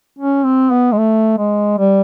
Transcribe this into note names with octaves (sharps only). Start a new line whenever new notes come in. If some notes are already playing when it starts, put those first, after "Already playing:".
C#4
C4
B3
G#3
A3
G#3
G3